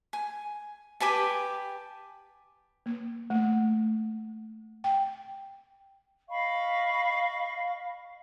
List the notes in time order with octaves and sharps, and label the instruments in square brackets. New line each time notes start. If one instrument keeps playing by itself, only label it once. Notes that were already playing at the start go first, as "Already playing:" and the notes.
[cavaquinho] G#5
G4 B4 G#5 A5
[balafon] A#3
A3
G5
[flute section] D#5 F5 B5 C#6